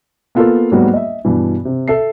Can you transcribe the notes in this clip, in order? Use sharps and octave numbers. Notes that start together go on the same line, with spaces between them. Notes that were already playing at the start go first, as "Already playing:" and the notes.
A#3 B3 F4 A4 A#4
G#2 F#3 G3 A#3 B3 F#4
D#5 E5
G2 B2 E3
C3
A4 E5 C7